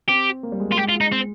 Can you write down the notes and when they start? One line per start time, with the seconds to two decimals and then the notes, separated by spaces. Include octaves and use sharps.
0.08 C4 G4
0.43 A#3
0.52 G3
0.60 G#3
0.70 A#3 F4
0.77 G#3 G4
0.89 F4
0.95 G#3
1.01 D#4
1.12 C4